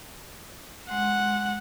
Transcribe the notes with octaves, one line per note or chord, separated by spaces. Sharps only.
G#3 F#5 C6